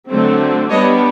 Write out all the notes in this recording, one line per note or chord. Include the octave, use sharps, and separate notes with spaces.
D3 F#3 A3 C4
G3 B3 D4 C#5 D#5